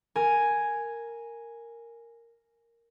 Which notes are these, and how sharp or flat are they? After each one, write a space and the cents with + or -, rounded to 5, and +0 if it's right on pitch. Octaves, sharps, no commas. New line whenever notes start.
A#4 -5 G#5 +0